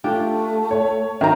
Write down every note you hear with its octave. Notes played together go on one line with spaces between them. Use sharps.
A3 D4 F4 G4
C#5
D#3 C#4 F#4 A#5